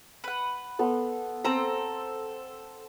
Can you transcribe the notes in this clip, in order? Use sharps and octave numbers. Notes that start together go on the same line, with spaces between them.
B4 F#5
B3 A4 C6
C4 A4 C5 A#5